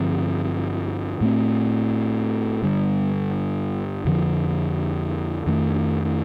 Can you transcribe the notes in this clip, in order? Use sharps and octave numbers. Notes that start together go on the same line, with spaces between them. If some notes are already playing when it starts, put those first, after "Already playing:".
Already playing: G2 D3 F3 C4
A2 A3 C4
G2 D3 G3
F2 D3 F3
F2 D#3 A3